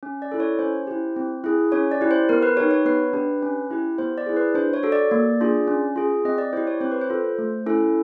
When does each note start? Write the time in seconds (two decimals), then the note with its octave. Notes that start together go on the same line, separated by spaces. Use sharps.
0.03 C#4
0.22 D5
0.32 E4 A4
0.40 C#5
0.59 C#4 C5
0.87 E4 G4
1.16 C4
1.44 E4 G#4
1.72 C#4 C#5
1.92 D5
2.01 E4 G4
2.11 C5
2.29 B3 A#4
2.43 B4
2.57 D#4 G4 C#5
2.71 C#5
2.85 B3 B4
3.13 D4 G4
3.43 C#4
3.71 E4 G4
3.98 B3 C5
4.18 D5
4.26 E4 G#4
4.36 B4
4.55 D4 C5
4.74 C#5
4.83 F#4 A4
4.92 D5
5.11 A#3
5.41 D4 F4 G#4
5.68 C#4
5.96 F4 G#4
6.25 C4 D#5
6.38 D5
6.53 E4 G4 C5
6.67 C#5
6.81 C4 C5
6.92 B4
7.01 C5
7.10 F4 A4
7.38 A3
7.66 C#4 E4 A4